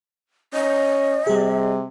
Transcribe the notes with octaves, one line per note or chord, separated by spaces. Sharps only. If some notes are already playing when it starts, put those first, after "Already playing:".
C#4 D#5
C3 G3 G#4